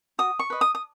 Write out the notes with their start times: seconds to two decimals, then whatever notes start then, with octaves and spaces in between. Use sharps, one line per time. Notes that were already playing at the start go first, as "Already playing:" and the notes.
0.19 F#4 D#6
0.39 C#6
0.50 B4 D#5
0.61 D#6
0.75 D#6